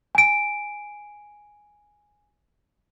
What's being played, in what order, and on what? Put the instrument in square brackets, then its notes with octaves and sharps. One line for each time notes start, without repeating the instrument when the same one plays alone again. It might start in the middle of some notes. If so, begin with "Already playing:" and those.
[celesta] G#5 D7